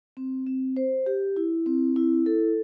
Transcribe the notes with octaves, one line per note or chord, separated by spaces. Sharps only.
C4
C4
C5
G4
E4
C4
E4
A4